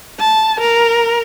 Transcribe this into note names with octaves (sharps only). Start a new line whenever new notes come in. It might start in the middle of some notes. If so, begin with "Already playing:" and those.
A5
A#4